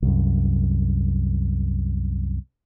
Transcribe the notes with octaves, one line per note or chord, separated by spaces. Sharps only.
C2 F#2